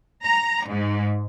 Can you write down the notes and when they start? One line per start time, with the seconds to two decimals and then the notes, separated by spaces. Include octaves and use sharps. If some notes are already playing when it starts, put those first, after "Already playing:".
0.25 A#5
0.67 G#2